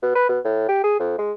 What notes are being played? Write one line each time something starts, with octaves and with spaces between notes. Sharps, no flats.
B2
B4
B2
A2
G4
G#4
F2
G#3